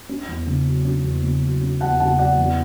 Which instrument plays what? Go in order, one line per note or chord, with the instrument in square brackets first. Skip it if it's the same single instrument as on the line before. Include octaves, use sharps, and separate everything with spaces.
[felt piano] C#4
E2
C#3
F#3
C#4
E2
C#3
F#3
C#4
E2 F#5 A5
C#3 F#5 A5
F#3 D5 F#5
E2